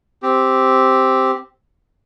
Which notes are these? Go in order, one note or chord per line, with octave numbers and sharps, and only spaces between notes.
C4 G4